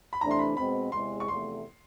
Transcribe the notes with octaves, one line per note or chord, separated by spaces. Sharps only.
B5
C3 E3 A3 D4 A#5
C6
B5
B2 G#3 C4 B5
E2 C3 E3 G#3 C6
C#6
E2 C3 F3 A3 C6